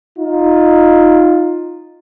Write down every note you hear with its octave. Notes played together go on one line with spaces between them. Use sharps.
D#4 F4